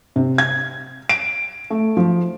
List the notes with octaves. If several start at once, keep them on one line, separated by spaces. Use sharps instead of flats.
C3
G#6
D7
A3
F3